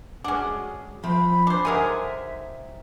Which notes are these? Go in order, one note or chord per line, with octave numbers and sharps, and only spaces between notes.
G#3 C#4 D4 F#4 G#4
F3 C4 E5 B5
D4 C5
D3 F#3 C4 D#4 G#4 A#4 E5 G#5